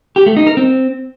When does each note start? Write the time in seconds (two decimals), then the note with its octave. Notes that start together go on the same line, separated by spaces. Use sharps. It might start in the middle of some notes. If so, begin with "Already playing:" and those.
0.16 G4
0.26 A3
0.37 D#4
0.47 A#4
0.57 C4